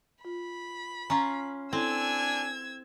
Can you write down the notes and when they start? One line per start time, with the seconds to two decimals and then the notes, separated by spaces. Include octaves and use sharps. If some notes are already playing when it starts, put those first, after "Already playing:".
0.25 F4 B5
1.10 C#4 F4 A#5
1.73 C4 D4 E4 A4 G#5 E6 G#6